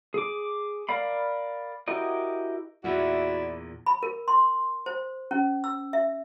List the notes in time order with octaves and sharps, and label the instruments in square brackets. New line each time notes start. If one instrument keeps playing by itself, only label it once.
[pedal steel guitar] G#4 D6
A#4 D5 F5 B5
E4 F#4 G4 A#4 D#5
[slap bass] E2 A#2 [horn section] E4 D5 [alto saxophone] F#4
[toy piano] B5
A#4
C6
C5
C#4
E6
E5